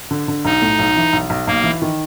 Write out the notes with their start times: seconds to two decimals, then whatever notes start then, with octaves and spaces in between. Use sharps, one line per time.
0.11 D3
0.28 D3
0.45 B1 D#4
0.62 A2
0.79 B1
0.96 E3
1.13 B1
1.30 B1
1.47 B1 A#3
1.64 E3
1.82 D#3